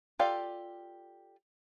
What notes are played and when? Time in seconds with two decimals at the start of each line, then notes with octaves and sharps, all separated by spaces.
0.19 F4 G4 A4 D5 F5